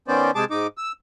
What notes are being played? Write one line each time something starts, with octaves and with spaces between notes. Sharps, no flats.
D#3 B3 C#4 C5 D5
C3 G#3 G#4 A5 D6
G#2 D#4 D6
E6